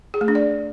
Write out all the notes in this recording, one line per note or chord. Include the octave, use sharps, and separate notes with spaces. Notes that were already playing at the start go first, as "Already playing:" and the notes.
G#4
A3
D4
D5